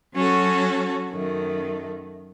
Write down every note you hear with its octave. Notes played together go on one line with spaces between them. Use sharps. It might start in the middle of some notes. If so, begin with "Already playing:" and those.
F#3 C#4 F#4 A4
F#2 D#3 A3